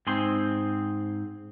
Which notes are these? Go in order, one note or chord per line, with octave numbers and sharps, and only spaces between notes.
G#2 C4 G#4 C6